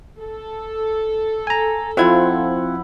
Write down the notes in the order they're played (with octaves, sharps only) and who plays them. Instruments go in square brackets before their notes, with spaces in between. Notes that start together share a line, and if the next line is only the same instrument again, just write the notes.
[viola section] A4
[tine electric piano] G#5 A#5
[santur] F3 E4 F#5 [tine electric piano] C4 F4 G#6